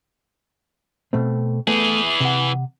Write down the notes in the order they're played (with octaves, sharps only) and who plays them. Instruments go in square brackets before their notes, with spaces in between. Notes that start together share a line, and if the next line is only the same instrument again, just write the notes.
[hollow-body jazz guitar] B2 A3 C4
[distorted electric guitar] E3 G#4 [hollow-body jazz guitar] A3 B3
[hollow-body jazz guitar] C3 F#5